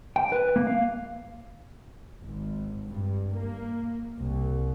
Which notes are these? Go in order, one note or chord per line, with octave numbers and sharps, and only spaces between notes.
G5
B4
A#3
F5
G#1
G2
A#3
C2